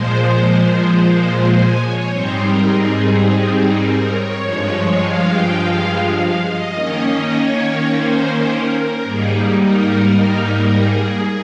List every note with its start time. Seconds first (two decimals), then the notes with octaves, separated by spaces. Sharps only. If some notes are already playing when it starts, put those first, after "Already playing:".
Already playing: A#2 F3 G#3 C5
0.35 C5
0.92 C5
1.51 G#5
1.80 C#5
2.08 G#2 G3 C4 D#4 C5
2.37 A#4
2.67 G#4
3.24 G#4
3.82 A#4
4.11 C#5
4.40 G2 F3 G#3
4.98 F5
5.27 G5
5.56 F5
6.14 F5
6.42 D#5
6.72 D#3 A#3 C#4
7.30 C#5
7.88 C5
8.45 A#4
9.03 G#2 G3 A#3 D#4 G#4
9.61 A#4
10.77 G#4